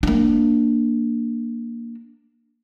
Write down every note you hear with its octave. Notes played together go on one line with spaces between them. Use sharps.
A#3 D4